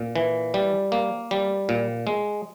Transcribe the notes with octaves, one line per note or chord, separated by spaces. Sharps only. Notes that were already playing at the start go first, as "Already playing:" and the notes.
Already playing: A#2
E3
G3
A#3
G3
A#2
G#3